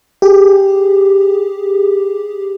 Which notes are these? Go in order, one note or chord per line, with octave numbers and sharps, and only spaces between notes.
G4 G#4